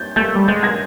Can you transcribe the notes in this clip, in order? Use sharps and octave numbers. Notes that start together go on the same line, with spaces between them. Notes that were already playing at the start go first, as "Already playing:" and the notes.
Already playing: G6 A6
A3 G6 A6
G3
G#3 G6 A6
G#6 A#6